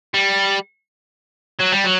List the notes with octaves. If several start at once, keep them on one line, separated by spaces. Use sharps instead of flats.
G3
F#3
G3
F#3